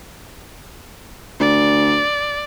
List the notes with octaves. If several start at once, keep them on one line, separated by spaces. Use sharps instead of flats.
D2 D5